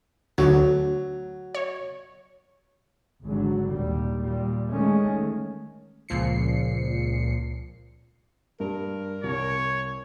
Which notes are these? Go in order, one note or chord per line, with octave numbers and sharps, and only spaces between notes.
D2 F#3
C#5
G#1 D3 F#3
D#2 A#2 G3
A#2 G3
D#3 G#3 A3 C#4
C#2 A#2 F3 C7 C#7
G2 A#4
C2 C#5